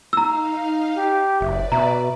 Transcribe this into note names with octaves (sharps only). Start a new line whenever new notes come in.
D#4 F5 A#5 E6
G4
F#1 B4 D5 E5
B2 E5 A#5